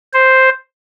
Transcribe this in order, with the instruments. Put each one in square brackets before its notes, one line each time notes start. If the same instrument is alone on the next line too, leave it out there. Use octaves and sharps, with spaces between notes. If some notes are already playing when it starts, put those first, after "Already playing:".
[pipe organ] C5